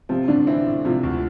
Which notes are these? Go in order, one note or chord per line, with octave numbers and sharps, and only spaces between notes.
C3 F3 C4
A2 D3 D4
E3 C4 E4
A2
C3 F3 F4
D2